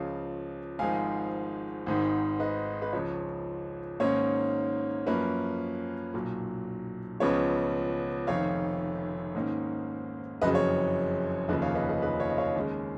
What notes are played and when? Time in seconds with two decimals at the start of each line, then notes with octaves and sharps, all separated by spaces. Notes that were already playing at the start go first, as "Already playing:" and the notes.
Already playing: C#2 C#3 F3 C#5 F5
0.79 G#1 G#2 F3 G#3 F5 G#5
1.86 G#1 G#2 D#3
2.39 B4 D#5
2.82 B4
2.93 C#2 C#3 F3 C#5
4.00 G#2 D#3 A#3 C#4 C#5
5.07 F#2 F3 A#3 C#4 B4
6.14 B1 A#2 F#3
7.20 C#2 C#3 F3 B3 C#5
8.27 F1 F2 D#3 C#5 F5
9.35 G#2 D#3 A#3 C#4
10.42 F#1 F2 C#3 F#3 B4 D#5
10.55 C#5
11.48 F1 D#2 C#3 F3 B4 D#5
11.62 C#5 F5
11.75 B4 D#5
11.89 B4 D#5
12.02 B4 D#5
12.20 C#5 F5
12.30 D#5
12.38 C#5 F5
12.56 D#2 C#3 G#3